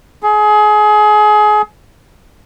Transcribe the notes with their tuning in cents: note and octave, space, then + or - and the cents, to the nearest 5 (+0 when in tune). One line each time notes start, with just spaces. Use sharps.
G#4 +25